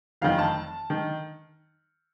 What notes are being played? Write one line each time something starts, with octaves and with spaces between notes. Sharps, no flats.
F1 F2 D#3 F5
A5
D#3